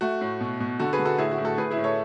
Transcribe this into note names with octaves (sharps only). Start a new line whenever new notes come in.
A3 F#4
A2
B2
B2
D3 F#4 A4
G#4 B4
D3
F#4 A4
A2 E4 G#4
F#4
A2
F#4 A4
A2 G#4 B4
E4 G#4
A2
A4 C#5